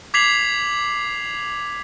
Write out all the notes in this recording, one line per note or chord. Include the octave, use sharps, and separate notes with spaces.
D6 G#6 B6 C7 F7 F#7